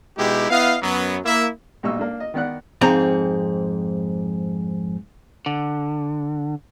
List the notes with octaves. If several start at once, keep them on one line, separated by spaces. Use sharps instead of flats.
B2 G#3 D#4 E4 G4
B3 E4 D#5 F5
F#2 F#3 B3
A#3 E4 E5
B1 A#2 G3 D#5 C#6 E6
A#3 D4
D#5
D#3 B3 D5 F#5 F#6
F2 G#2 C4 A#5
D3